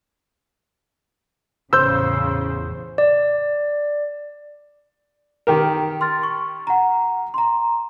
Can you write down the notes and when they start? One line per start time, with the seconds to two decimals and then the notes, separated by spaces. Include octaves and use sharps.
1.73 A1 E2 C#3 C5 E6 G6
2.98 D5
5.47 D#3 G4 A#4
6.01 C6 F6 A6
6.23 C#6
6.67 F#5 A#5
7.34 A#5 C6